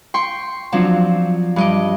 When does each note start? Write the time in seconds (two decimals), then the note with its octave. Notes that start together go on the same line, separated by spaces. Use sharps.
0.14 G5 C6 C#6
0.72 F3 F#3 C4 D4
1.56 G2 D#5 D6